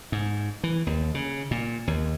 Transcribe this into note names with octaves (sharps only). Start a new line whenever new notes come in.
G#2
E3
D#2
C#3
A#2
D#2